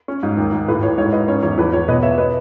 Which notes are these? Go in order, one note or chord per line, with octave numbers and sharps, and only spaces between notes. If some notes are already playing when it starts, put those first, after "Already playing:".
C#4
G#2
D#2
D#2
A2 B4
A2 C#5
G#2 C#5
G#2 B4 D#5
C#4 C#5
E2 C#5
E2 B4
E2 C#5
B2 B4 D#5
B2 C#5 E5
B3 B4 D#5